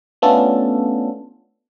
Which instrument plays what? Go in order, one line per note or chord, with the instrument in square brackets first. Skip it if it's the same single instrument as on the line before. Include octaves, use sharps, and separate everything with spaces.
[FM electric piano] A3 B3 C#4 D4 F4 A4